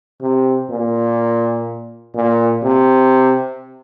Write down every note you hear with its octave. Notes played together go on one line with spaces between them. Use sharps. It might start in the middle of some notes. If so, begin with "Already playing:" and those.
C3
A#2
A#2
C3